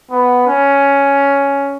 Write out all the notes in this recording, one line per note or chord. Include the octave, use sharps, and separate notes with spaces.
B3
C#4